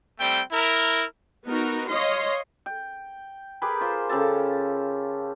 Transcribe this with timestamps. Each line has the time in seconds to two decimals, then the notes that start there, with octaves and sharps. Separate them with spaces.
0.20 G3 A3 C4 G5
0.52 E4 A#4
1.46 B3 D#4 F#4 A#4
1.90 C#5 D#5 F5 C6
2.66 G5
3.62 G4 G#4 A#4 B4
3.81 F4 C5
4.09 C#3 G4 A4 A5